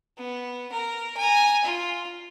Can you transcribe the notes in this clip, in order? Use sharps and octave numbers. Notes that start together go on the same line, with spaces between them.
B3
A#4
G#5 A#5
F4